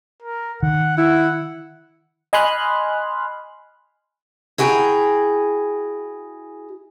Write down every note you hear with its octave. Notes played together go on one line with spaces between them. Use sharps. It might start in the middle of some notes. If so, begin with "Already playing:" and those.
A#4
D#3 F#5
E4 F#5
D#5 G#5 B5 C6 F6 F#6
E4 F#4 G#4 G5 A#5